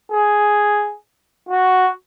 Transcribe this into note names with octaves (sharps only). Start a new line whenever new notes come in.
G#4
F#4